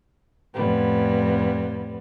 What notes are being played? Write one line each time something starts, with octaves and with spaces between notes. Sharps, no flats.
F2 A2 G3 B3